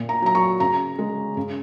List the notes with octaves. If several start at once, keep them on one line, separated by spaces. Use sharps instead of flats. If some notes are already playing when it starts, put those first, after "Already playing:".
Already playing: A#2
A#5
F#3 A#5
C#6
C#3 A#5
G#3
C#3